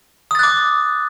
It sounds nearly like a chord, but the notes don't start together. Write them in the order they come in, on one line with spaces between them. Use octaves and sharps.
D#6 A6 F#6 D6